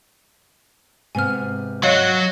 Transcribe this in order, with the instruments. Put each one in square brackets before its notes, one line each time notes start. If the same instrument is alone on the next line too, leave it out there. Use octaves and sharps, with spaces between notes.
[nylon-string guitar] G#2 C3 B3 [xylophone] G#5 F6
[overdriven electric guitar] F#3 [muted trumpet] F#4 [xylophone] C#5 D#5 F5